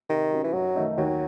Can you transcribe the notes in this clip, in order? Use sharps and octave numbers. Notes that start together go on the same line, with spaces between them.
C3 D#3
F#3 C#4
E3
F#2 F#3
D#3 A3 D#4
D#2 F#3